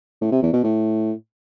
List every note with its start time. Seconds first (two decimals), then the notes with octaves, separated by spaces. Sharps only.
0.21 A2
0.32 C3
0.43 E2
0.53 B2
0.64 A2